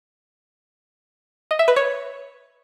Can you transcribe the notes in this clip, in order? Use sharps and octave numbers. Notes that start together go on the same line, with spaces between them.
D#5
E5
B4
C#5